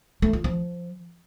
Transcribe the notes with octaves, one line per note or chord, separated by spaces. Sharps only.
A3
F4
F3